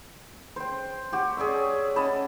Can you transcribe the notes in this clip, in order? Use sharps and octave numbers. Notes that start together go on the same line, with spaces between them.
C5 G5
F#4 G4
G#4 C#5 D5 E5
C#4 D#5 A5 B5